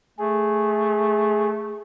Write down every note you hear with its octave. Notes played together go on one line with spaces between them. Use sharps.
A3 G#4